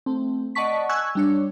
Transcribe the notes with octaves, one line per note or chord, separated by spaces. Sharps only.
A3 C4
D5 D#5 F#5 A5 C#6 B6
G#5 C#6 E6 F#6 G#6
G3 D4 C#5